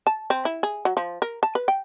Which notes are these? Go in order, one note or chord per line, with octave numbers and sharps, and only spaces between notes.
A5
C4
E4
G#4
F#3
F3
A#4
A5
B4
G5